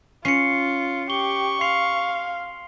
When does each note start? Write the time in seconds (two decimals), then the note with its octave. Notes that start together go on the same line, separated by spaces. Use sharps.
0.25 C#4 F4 C7 C#7
1.10 G4 C#6 G7
1.61 F5 C6 C7 F7